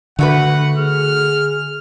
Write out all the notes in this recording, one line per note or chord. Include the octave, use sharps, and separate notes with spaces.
D3 A3 F#4 B4 F#5
G#4 F6